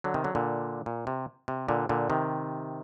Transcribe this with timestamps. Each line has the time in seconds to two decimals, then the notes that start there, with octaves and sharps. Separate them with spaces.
0.04 D3 F#3
0.14 C3 D#3
0.24 D3 F#3
0.35 A#2 D3
0.86 A#2
1.07 C3
1.48 C3
1.68 A#2 D3
1.89 A#2 D3
2.10 C3 D#3